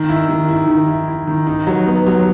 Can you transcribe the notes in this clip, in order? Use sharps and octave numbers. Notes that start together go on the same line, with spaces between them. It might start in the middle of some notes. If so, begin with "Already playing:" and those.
Already playing: D#3
E4
D#3
E4
D#3
E4
E4
D#3
D#4
F#3
B3
F#3